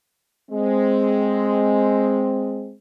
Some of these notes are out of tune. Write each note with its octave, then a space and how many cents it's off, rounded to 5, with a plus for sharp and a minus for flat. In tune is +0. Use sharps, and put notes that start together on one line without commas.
G#3 +0 C4 +0